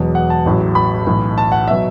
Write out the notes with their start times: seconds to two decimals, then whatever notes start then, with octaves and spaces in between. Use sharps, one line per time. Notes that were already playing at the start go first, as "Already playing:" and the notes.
Already playing: E1 E2 B2 F#3
0.15 F#5
0.30 A5
0.46 A1 A2 F#3
0.75 B5
1.07 B1 A2 E3
1.38 A5
1.52 F#5
1.68 B2 F#3 E5